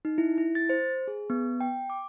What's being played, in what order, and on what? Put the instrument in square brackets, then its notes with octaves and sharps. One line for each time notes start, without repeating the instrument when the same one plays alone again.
[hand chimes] D#4
E4
E4
A6
C5
G#4
B3
G5
D6